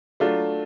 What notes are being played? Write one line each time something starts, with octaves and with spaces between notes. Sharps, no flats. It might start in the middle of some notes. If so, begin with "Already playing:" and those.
F#3 A3 D4 F4